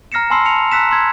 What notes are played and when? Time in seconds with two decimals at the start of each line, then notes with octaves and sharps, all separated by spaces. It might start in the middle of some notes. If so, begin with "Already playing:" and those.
0.12 A#5 F6 A#6 C7 C#7 E7
0.30 G#5 A5 B5 C6 E6 C7
0.45 A5 C#7 F7
0.71 A#5 E6 F#6 B6 E7
0.91 C6 E6 G#6